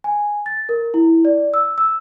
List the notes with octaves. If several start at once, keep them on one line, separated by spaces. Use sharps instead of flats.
G#5
A6
A#4
E4
D5
E6
E6